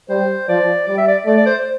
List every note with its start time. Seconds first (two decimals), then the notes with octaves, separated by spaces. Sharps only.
0.09 G3 C5
0.48 F3 D5
0.87 G3 D5
0.97 E5
1.08 D5
1.26 A3 D5
1.37 D5
1.46 C5